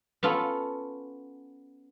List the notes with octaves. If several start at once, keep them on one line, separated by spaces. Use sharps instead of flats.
B3 C#4 F4 A4